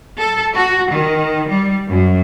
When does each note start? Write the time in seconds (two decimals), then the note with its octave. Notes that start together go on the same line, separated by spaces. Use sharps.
0.19 A4
0.55 F#4
0.92 D#3
1.49 G3
1.89 F#2